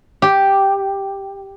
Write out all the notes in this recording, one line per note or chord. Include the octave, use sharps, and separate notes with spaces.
G4